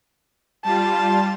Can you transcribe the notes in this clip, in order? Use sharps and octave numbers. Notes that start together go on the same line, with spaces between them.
G3 F4 A5